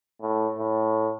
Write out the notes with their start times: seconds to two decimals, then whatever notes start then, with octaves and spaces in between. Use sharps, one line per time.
0.21 A2
0.58 A2